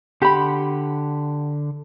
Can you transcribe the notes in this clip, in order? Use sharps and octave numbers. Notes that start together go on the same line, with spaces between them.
D3 G4 F#5 B5 C6